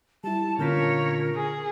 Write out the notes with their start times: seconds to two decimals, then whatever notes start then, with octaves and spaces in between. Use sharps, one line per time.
0.24 G3 E4 A5
0.59 A#2 D3 C#4 F4 A#4 C#5 G6 B6
1.35 G#4 D#6